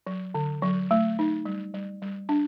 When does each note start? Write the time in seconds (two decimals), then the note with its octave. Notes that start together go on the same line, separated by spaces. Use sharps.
0.07 F#3
0.34 D3
0.62 F#3
0.91 A3
1.19 D#4
1.45 G3
1.74 G3
2.02 G3
2.29 D4